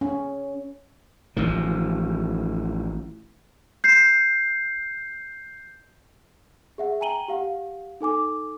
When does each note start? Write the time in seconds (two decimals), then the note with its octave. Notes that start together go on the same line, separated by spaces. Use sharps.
0.01 C#4
1.37 A1 D#3 F3
3.84 G6 C7
6.78 G#4 E5 F#5
7.01 G5 G#5 A#5 D#7 F#7 G7
7.28 G4 F5 F#5
8.01 D#4 A4 G#5 D6